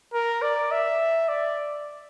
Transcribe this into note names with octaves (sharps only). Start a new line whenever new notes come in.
A#4
D5
E5
D5